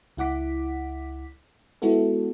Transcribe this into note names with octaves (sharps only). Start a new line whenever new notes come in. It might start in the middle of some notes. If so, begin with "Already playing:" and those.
C#2 E4 F#5 D6 B6
G#3 B3 E4 F#4 A4